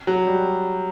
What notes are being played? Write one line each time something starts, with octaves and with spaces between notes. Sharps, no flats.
F#3
G3